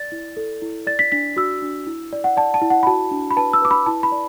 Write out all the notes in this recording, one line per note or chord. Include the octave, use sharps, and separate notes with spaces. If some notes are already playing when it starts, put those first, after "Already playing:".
Already playing: D5 A6
E4
A4
E4
D5 A6
B6
D4 B6
F#4 E6
D4
E4
D5
F#5
D5 A5
A5
E4
F#5
B5
F#4 A5
D4
B5
B4 A5
E6
B4 D6
B5
E4 A5
B5
D5